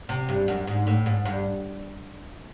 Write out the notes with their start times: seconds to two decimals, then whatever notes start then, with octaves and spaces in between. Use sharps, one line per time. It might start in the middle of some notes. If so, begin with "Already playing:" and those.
0.09 C3
0.29 G2
0.48 F#2
0.67 G#2
0.87 A2
1.06 G#2
1.25 G2